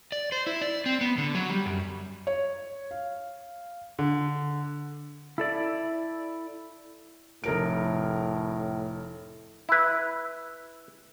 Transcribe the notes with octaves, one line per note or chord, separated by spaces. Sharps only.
D5
C5
E4
D5
C4
B3
D3
F#3
G3
F#2
C#5
F5
D3
E4 A4 D5
F1 A2 A#4 D7
E4 B4